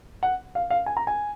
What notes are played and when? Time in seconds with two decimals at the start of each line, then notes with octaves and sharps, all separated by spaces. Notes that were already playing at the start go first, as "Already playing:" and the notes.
0.23 F#5
0.55 F5
0.70 F5
0.86 G#5
0.97 A#5
1.07 G#5